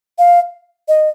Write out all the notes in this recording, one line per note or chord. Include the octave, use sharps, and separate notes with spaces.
F5
D#5